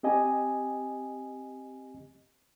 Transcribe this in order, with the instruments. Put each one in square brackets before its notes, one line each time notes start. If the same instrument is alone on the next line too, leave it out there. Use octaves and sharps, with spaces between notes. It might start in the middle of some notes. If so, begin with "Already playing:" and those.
[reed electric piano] C4 G4 D#5 G#5